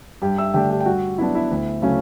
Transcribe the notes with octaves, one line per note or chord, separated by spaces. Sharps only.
G2 G4 G5
E5 E6
D3 A3 D4 G4 G5
G4 G5
G5
G2 F#4 F#5
F#3 B3 D4 E4 E5
E4 E5
D2
C#3 F#3 A3 C#4